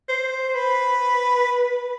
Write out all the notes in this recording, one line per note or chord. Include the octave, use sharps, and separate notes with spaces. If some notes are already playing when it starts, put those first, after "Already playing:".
C5
B4